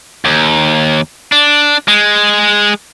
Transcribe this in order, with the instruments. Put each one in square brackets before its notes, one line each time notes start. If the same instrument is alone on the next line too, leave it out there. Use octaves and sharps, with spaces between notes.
[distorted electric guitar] D#2
D4
G#3